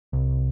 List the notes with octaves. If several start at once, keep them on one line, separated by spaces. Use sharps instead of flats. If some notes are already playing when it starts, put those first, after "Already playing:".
C2